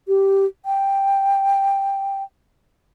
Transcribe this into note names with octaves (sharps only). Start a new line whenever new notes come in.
G4
G5